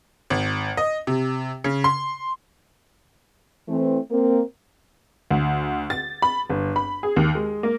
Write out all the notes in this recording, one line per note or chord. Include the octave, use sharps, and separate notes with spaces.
G#1
D#5
C3
C#3
C6
E3 A3 C4
A#3 C4 A#4
D2
A6
B5
G1
B5
G#4
D#2
G#3
A#3